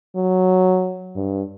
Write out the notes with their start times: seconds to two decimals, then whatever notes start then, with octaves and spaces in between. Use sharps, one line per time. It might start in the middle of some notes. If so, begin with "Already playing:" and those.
0.16 F#3
1.16 G2